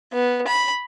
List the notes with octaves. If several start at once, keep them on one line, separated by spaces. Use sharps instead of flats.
B3
B5